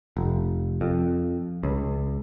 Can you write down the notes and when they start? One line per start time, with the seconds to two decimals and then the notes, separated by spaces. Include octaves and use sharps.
0.17 F1
0.81 F2
1.63 C#2